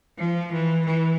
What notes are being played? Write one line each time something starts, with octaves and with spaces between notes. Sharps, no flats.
F3
E3
E3